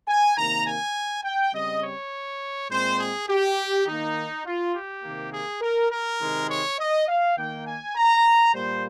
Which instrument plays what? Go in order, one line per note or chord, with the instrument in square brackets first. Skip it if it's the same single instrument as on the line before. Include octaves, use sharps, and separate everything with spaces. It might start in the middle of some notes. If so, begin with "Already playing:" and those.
[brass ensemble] G#5
C3 D#3 A#3 A#5
G#5
G5
C#3 G3 C4 D#5
C#5
A#2 G#3 C4 C5
G#4
G4
D#3 A#3 D#4
F4
G4
C3 D#3 A#3
G#4
A#4
A#4
C3 D#3 G#3
C#5
D#5
F5
D#3 A#3 G5
G#5
A#5
A#2 G3 A#3 C5